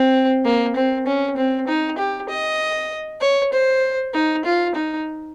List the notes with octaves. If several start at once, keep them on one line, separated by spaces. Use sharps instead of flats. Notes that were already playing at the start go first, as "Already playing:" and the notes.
Already playing: C4
A#3
C4
C#4
C4
D#4
G4
D#5
C#5
C5
D#4
F4
D#4